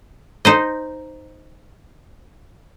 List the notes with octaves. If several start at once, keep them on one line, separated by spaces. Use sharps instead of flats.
D#4 C5 D#5